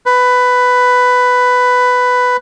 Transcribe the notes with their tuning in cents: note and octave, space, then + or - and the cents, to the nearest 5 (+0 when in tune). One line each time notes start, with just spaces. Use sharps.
B4 +10